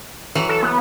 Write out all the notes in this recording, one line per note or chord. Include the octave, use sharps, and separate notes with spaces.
E3 F#3 F#4
A4
B3